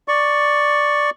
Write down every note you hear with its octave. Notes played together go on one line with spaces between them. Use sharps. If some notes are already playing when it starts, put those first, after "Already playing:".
D5 C#6